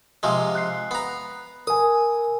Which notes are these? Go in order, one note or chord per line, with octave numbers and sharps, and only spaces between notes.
C3 F3 G#3
F#6 C7
B3 A#5
A#4 G#5 D#6